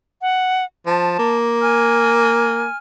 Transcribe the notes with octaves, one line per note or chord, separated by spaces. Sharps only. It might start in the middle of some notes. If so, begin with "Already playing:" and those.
F#5
F3 A5
A#3
G#5 F6